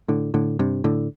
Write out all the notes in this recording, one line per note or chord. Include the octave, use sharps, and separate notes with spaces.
A2 D3
A2 D3
G2 C3
A2 D3